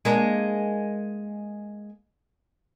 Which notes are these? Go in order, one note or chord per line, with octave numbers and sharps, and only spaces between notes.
G#3 A#3 D4